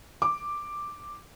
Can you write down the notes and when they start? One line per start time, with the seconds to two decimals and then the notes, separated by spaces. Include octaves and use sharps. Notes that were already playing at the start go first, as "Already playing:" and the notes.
0.22 D6